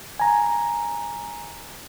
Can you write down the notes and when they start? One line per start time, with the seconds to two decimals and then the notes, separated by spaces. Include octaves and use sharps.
0.20 G#5 A#5